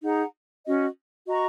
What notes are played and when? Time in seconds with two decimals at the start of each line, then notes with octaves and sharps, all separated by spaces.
0.02 D#4 G#4 F#5 A#5
0.64 C#4 F#4 D#5
1.27 F#4 D#5 A#5 C#6